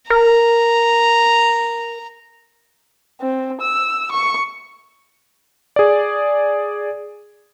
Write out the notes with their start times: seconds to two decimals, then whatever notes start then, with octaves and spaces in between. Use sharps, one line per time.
0.10 A#4 A#5
3.21 C4
3.61 E6
4.12 C#6
5.76 G#4 D5